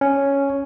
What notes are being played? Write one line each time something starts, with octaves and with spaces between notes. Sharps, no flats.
C#4